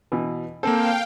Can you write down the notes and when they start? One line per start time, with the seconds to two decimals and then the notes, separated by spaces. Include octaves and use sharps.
0.12 B2 E3
0.63 A#3 C4 A4 C5 F5 G5